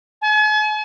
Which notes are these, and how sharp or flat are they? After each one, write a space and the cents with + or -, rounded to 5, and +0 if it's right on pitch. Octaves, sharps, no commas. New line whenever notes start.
G#5 +45